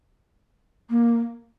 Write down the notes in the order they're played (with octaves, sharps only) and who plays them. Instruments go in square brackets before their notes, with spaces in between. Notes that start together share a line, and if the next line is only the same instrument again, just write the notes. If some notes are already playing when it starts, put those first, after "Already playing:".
[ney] A#3